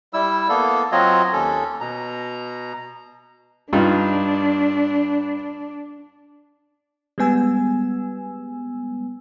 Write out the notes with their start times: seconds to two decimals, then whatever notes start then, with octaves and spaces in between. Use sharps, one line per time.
0.13 G3 E4 E6
0.49 A#3 B3 A4
0.92 F#3 C4 F4 F#4 C#5 D#5
1.33 D#2 C#4 A4
1.80 B2 A#5
3.73 G2 D4 D#4 F4
7.18 G3 G#3 B3 G#5 E6